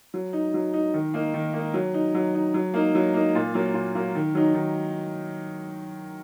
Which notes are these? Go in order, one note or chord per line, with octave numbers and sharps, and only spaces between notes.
F#3
D#4
F#3
D#4
D#3
A#3 D#4
D#3
A#3 D#4
F#3
D#4
F#3
D#4
F#3
A#3 D#4
F#3
A#3 D#4
A#2
F#3 A#3
A#2
F#3 A#3
D#3
F#3 D#4
D#3